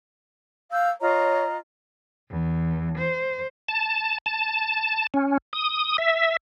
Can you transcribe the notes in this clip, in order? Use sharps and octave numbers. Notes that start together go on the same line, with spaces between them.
F5 E6 G6
F4 C#5 D#5 A#5
E2
C5
A5
A5
C#4
D#6
E5